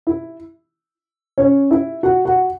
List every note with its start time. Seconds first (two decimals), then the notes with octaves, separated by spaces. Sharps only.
0.07 E4
1.38 C#4 C#5
1.71 E4 E5
2.03 F#4 F#5
2.25 F#4 F#5